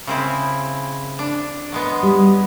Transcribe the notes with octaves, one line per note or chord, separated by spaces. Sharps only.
C#3 C4 E4
D4
F#3 G#3 B3
G3